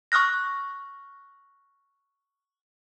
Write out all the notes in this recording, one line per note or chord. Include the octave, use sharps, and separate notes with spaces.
C#6 D#6 F6 F#6 A#6